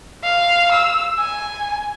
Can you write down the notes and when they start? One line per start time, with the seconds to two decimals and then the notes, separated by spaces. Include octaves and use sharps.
0.24 F5
0.72 E6
1.19 G#5